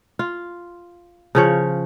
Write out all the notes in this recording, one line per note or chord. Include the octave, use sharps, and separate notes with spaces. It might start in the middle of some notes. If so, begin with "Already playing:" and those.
F4
C#3 F3 C#5